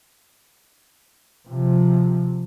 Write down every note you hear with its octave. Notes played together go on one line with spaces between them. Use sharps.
C3 F3